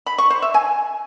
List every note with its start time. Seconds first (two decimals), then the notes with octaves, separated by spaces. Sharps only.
0.06 B5
0.18 C#6
0.30 C5
0.42 E5
0.54 G#5